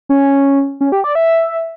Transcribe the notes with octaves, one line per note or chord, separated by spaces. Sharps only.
C#4
C#4
G4
D5
E5